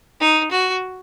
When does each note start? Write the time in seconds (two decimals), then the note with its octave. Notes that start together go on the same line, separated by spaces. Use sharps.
0.21 D#4
0.51 F#4